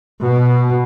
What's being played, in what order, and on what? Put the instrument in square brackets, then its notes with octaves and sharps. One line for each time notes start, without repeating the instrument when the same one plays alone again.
[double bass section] B2